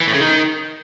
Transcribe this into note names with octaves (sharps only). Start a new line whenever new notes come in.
E3
A2
C#3
D#3